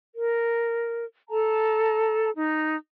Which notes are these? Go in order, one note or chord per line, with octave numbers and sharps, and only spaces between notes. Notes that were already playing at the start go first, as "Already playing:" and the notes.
A#4
A4 A5 A#5
D#4